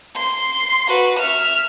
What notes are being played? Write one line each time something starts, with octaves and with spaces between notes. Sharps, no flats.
C6
F#4 B4
E5 F6